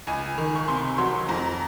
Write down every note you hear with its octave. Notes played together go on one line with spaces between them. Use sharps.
C#2 G#5
D#3
C#6
C3 C6
F#3 C6
F2 A#5